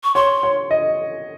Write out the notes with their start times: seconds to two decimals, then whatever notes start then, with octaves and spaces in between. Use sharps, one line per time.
0.04 C#6
0.15 C#5 C6
0.43 C#5
0.71 D#5